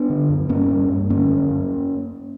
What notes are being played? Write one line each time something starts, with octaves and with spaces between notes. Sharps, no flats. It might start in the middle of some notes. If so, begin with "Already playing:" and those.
Already playing: B3 D4
D3
F#2
G2 A#3 C#4
G2
G2
D3 A#3 C#4
F#2
F#2